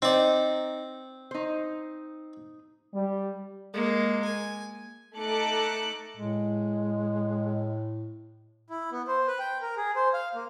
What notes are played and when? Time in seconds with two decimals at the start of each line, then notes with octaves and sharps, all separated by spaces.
0.02 C4 D#4 D5
1.31 D#4 C5
2.94 G3
3.73 G#3 A#3
4.24 G#5
5.16 A3 D#4 A4 D6 F#6 C#7
6.17 A2 G#3
8.70 E4
8.92 B3
9.07 C5
9.27 B4
9.39 G5
9.61 A#4
9.77 G#4
9.96 C5
10.14 F5
10.35 A#3